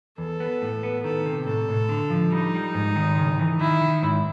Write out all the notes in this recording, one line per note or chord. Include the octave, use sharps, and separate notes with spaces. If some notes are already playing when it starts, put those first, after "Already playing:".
E2 A4
B3
A2
B3
D#3 A4
C3
A2 A4
A2
D3
F3
G3 D#4
G3
G#2
D#3
C#3
E3
D#3 E4
D#3
G#2